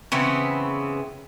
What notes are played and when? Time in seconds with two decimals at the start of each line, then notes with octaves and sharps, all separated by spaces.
0.12 C#3 E3 B3 C4